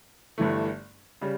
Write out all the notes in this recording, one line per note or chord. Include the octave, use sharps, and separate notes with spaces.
G1 G2 E3 A3
C#3 G3